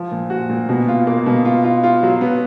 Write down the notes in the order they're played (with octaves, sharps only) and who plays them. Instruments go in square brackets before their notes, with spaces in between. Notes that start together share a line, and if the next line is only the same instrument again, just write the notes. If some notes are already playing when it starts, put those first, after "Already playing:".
Already playing: [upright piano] F3
A#2
F#4
A#2
B2
F4
A#3
B2
F4
F4
F4
F#3
B3